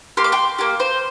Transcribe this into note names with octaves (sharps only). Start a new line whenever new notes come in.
A#3 G4 C6
D6
G5 C6
A#3 G4
C5